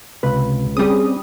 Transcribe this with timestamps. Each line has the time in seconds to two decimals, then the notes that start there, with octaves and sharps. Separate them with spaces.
0.23 C#2 C3 B4 B5
0.77 G3 C4 C#4 G#4 D#6